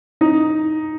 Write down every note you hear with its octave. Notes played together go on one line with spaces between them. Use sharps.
D#4